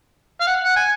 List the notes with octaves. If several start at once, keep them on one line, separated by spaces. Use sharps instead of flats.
F5
F#5
F#5
G#5